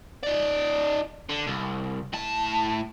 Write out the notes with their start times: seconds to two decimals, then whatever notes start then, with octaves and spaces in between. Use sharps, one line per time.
0.23 D#4 D5
1.29 D3
1.47 C2
2.13 A2 A5